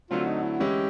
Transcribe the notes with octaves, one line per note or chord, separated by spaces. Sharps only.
D3 F#3 A3 C4 F4
D#4
E4
E3 G#3 C#4 E4 G4